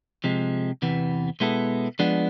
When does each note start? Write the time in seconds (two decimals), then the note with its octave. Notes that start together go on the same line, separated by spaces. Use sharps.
0.24 C3 F3 G#3
0.82 E2 C3 E3 B3
1.40 B2 G#3 B3 E4 A4
1.99 F3 G#3 B3 D4